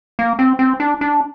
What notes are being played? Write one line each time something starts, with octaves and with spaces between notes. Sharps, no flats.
A#3
C4
C4
D4
D4